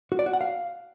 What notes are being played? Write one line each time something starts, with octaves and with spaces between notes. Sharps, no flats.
F#4
D5
F#4
F#5
F5